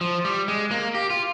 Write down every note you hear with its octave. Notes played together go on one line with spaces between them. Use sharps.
F3
G3
G#3
A#3
G4
F4